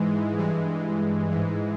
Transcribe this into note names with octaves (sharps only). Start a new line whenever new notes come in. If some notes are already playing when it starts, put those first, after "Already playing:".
Already playing: G#2 E3 G#3
G2 E3 G#3
G#2 E3